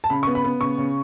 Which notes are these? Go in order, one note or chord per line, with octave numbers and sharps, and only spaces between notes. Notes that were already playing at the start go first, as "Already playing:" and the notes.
A5
C#3 B5
C#6
B3
B5
B3
C#3 C#6
C#3